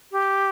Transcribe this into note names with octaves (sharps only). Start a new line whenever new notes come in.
G4